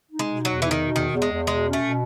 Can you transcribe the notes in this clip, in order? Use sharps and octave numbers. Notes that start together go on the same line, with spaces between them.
D#4
G#3
B2
E2 F#3
E3 D#4
D#3
B2
E2 D#3
E2
G#3
E2
B2 G#3
C#4
A3
B2